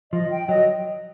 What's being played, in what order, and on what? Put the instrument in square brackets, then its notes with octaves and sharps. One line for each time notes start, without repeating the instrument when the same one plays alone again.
[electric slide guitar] F3 [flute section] D#5
[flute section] G5
[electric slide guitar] F#3 [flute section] D#5